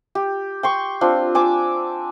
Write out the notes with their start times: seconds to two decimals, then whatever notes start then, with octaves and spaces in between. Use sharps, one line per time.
0.15 G4
0.63 G5 C6 C#6
1.01 C4 D4 F4
1.35 D5 G#5 D6 E6